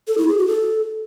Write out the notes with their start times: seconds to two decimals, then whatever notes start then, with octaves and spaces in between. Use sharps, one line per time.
0.08 A4
0.18 E4
0.28 G#4
0.38 F#4
0.48 A4